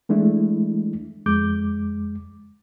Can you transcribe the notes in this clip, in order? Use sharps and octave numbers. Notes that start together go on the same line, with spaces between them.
E3 G#3 A3 D4 E4
F2 G#3 D6 G6